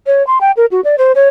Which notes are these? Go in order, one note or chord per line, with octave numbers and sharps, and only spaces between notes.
C#5
C6
G5
A#4
F#4
D5
C5
C#5